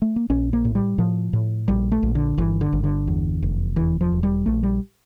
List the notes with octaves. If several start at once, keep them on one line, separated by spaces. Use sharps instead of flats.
A3
A#3
A#1 C#4
A#3
A2
G3
A2 F3
A2
A#1 G3
A3
A#1
D3
G1 E3
D3
G1
D3
E2
F1
E2 E3
F3
E1
G3
A#1 A3
G3